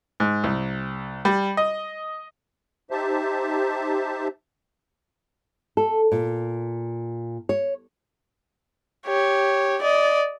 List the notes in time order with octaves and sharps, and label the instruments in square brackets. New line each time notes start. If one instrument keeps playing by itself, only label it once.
[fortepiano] G#2
C2
G3
D#5
[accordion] D#4 G4 C5 E5 A5
[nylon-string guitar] A4
A#2
C#5
[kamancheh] G4 C#5
D5 D#5